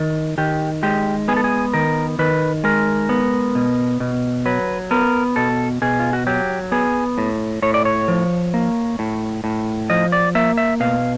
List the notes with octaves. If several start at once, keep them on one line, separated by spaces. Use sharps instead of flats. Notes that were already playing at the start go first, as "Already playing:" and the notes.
Already playing: D#3
D#3 G4
G#3 G4
B3 G#4
A4
G#4
D#3 A#4
D#3 B4
G#3 A#4
B3
B2
B2
F#3 B4
B3 A#4
B2 A4
B2 G#4
F4
F#4
F#3 G4
B3 G#4
A2
A2 C#5
D5
C#5
F3
A#3
A2
A2
F3 D#5
D5
A#3 E5
E5
B2 F5